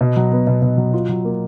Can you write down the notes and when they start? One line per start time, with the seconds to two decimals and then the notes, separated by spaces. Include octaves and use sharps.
0.01 B2
0.16 F#3
0.32 B3
0.47 B2
0.62 B2
0.78 F#3
0.93 F4
1.09 F#3
1.25 A#3